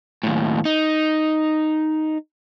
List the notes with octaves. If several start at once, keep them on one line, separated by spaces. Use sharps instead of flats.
D#2 A2
D#4